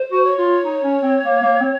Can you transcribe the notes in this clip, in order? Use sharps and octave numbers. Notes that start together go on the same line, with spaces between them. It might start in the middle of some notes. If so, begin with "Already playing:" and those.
Already playing: C5
F#4
C#5
F4
D#4
C#4
C4
A#3
A#3
C4